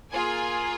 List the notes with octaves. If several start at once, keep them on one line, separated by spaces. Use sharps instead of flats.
A#3 F4 G#4 G#5